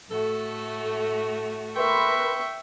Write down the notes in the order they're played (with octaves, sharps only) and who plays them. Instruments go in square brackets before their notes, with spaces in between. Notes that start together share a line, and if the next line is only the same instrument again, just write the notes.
[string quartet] A2 A3 F#4 [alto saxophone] A4
[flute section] A#4 B4 C6 [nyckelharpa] E5 C#6 [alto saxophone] G5